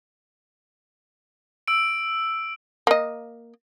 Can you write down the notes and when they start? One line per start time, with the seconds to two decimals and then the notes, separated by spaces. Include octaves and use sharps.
1.68 E6 D7
2.87 A#3 D#5